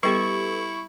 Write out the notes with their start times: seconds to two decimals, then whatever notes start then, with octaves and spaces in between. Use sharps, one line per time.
0.03 G3 B3 E4 G4 A4 B4 C#6